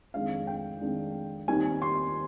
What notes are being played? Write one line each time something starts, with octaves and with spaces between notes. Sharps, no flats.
F2 D#3 G#3 D4 F5
G5
F2 D#3 G#3 D4
D#2 D#3 G3 C4 G#5
C6